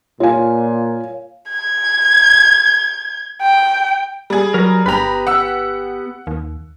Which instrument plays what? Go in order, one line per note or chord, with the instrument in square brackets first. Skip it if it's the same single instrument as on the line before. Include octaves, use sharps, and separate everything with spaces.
[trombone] A#2 [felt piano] F4 G#5 [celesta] C#5 F5
[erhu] G#6
G5
[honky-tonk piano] G3 G#4
[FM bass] F#3 [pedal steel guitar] A#4 A#5
[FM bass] G1 [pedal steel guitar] B3 G4 B4 [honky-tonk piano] A#5 B5
[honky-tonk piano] F#5 E6
[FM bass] D#2